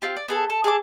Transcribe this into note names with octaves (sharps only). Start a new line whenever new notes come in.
C4 F4 G4
D5
B3 G#4 A4
A4
G#4 A4 G5 D6